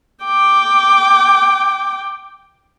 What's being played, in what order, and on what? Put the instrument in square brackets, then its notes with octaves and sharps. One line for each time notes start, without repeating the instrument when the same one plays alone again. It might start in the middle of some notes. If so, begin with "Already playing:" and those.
[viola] G5 D6